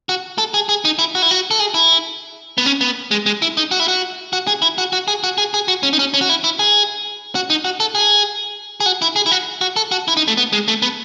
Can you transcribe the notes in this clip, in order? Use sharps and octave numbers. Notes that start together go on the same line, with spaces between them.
F#4
A4
G#4
G#4
D#4
E4
F#4
E4
F#4
A4
G#4
E4
B3
C#4
B3
G#3
G#3
E4
D#4
F#4
E4
F#4
F#4
G#4
E4
F#4
F#4
G#4
F#4
G#4
G#4
F#4
C#4
D#4
C#4
C#4
F#4
E4
E4
G#4
F#4
D#4
F#4
A4
G#4
G#4
F#4
E4
G#4
E4
F#4
F#4
A4
F#4
E4
D#4
A3
B3
G#3
A3
B3